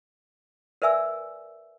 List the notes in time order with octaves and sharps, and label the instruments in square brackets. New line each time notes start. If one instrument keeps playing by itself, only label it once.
[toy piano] A#4 B4 D5 E5 G#5 E6